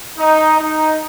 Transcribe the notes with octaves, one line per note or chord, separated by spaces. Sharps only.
D#4
D#4